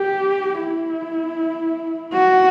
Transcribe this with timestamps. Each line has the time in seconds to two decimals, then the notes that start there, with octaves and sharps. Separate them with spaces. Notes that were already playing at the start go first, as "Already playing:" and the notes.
Already playing: G4
0.62 E4
2.13 F#4